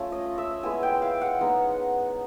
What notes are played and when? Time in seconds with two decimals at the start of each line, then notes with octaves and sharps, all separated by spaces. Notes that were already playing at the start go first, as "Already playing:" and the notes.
Already playing: A3 C#4 F4
0.12 D#5
0.38 E5
0.63 G#3 B3 E4 G#5
0.83 G5
1.02 F5
1.21 F#5
1.41 G#3 B3 D#4